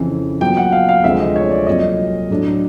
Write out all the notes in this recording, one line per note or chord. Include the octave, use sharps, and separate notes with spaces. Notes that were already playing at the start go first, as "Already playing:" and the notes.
Already playing: F2 C#3 E3
A#2 F#3 B3 G5
F#5
F5
F5
D2 C3 F3 G#3 E5
D#5
C#5
D5
C2 A#2 F#3 D#5
A2 F#3 A3 D4